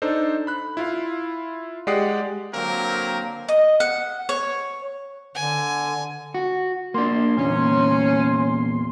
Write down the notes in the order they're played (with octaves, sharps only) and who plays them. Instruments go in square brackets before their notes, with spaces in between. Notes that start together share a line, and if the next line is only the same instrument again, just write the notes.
[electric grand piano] D4 D#4 A4 C5
B5 F#6
E4 F4 F5
G#3 G4 D5 F#5 D#6 C7
[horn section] D3 F#3 A#3 C4 A#4
[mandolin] D#5
F#5
C#5
[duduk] D3 [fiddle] G#5
[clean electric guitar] F#4
[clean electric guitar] A#3 D4 [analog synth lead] C6
[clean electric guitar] E2 A#2 [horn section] C#4